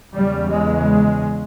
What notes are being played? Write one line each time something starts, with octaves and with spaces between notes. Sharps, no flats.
E2 C#3 G3
G#3